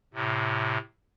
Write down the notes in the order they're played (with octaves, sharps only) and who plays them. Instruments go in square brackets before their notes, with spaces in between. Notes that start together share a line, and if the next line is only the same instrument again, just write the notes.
[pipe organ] A2 C3